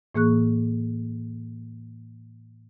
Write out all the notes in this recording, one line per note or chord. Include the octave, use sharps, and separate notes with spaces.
A2 E3 A#3 G#4 C#6 F#6